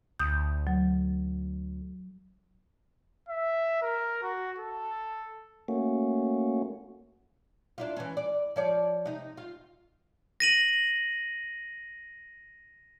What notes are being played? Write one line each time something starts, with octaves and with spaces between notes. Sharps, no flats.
D2 D#6 G6
F#3
E5
A#4
F#4
A4
A3 A#3 C#4 F#4
D4 E4 F4
E3 C#4
D5
F3 C#5 D5
C3 D#4
F4
A#6 D#7 F#7